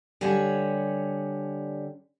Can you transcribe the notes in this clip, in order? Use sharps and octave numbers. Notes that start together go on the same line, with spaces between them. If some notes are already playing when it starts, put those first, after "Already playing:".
D3 G3 C#5 G#5